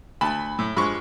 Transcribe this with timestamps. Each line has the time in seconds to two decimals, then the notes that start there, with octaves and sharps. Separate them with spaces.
0.21 D2 A5 B5
0.59 A2
0.77 G2 F3 G#3 B5 C#6